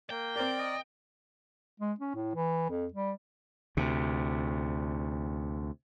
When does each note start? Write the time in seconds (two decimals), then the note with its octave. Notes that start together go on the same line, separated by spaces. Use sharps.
0.10 A#3 G5
0.36 C4 A#4 D5
0.59 D#5
1.80 G#3
2.00 C#4
2.15 A2
2.35 E3
2.70 F2
2.93 G3
3.77 D2 C3